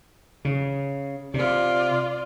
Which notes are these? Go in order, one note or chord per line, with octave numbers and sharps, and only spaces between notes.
C#3
C3 F4 D5